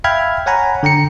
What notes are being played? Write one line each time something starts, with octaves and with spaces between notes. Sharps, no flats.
E5 F5 G5 B5 F6 G#6
C#5 F#5 G#5 A#5 B5
D3 G5 A#5 C#7